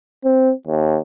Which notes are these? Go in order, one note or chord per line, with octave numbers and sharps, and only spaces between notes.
C4
D#2